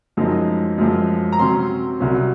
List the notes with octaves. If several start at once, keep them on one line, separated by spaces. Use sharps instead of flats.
F#2 F3 G#3 D#4
F#2 F3 G#3
A#5
C3 F#3 C#4 C6
C2 C3 F#3 C#4